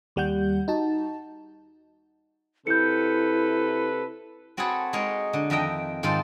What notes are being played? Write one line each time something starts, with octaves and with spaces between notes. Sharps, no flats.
D#2 G3 F#5 G6
D#4 F#4 A5
C3 E4 A4 B4 G6 C#7
C4 F#4 G#4 A4 B4 C#5
G#3 D#4 A#4 C#5
D3
F2 D#3 D#5 E5 G5 A#5
G#2 D#3 F3 F4 A4 C5